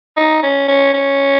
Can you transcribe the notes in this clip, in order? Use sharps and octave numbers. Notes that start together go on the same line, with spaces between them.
D#4
C#4
C#4
C#4